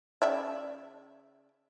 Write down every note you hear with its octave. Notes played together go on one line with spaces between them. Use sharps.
C#3 D5 E5